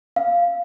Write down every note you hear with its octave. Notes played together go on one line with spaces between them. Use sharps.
F5